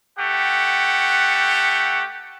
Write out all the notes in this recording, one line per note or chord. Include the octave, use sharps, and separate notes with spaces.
A3 G4 F#5